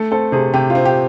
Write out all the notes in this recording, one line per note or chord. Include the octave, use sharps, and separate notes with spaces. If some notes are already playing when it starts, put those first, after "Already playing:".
Already playing: A3 A4
C4 A4
C3 G#4
C3 G4
F4
C4
G4